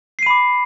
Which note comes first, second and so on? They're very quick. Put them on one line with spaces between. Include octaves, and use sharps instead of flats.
C7 D#7 B5 D6